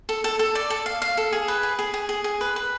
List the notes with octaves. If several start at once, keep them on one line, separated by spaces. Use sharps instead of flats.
A4
A4
A4
D5
A4
F5
F5
A4
G#4
B4
G#4
G#4
G#4
G#4
G#4
B4
B4